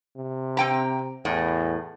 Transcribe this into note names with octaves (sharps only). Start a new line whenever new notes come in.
C3
C4 G5 A#5
E2 A2